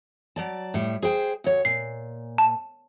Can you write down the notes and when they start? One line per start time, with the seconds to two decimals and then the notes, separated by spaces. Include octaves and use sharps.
0.36 F#3 D5 A5
0.74 A2 G3
1.02 G#4 C5 G5
1.44 D2 C#5
1.65 A#2 C7
2.38 A5